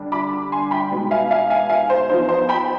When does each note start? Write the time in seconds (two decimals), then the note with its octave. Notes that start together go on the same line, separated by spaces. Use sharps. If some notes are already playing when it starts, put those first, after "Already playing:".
Already playing: D3 G3 D4
0.12 B5 D6
0.52 G#5 C6
0.71 G5 B5
0.91 B2 G#3 B3 D#4
1.11 F5 G#5
1.31 F5 G#5
1.50 F5 G#5
1.70 F5 G#5
1.90 C5
2.09 F3 B3 D#4 C5
2.29 C5
2.49 G5 B5